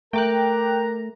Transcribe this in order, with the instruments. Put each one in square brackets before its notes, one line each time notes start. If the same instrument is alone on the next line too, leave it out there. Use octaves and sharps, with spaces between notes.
[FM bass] A3 [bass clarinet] A#4 [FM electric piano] G5 D6 F#6 [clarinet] A#5